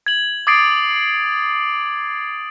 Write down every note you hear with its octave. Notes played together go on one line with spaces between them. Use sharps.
G#6 F#7
D6 D#6 G#6 A6 C7 D7